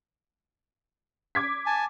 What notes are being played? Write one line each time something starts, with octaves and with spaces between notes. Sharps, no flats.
D6 G#6 B6
G#5 A5